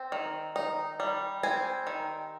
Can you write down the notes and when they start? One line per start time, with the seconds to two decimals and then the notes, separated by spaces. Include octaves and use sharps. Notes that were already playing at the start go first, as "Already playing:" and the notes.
Already playing: C4 G5
0.12 D#3
0.56 D#4
1.00 G3
1.43 C4 G#5
1.87 D#3